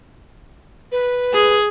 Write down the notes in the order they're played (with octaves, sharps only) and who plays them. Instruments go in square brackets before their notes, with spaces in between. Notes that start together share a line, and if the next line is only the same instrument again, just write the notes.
[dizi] B4
[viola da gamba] G#4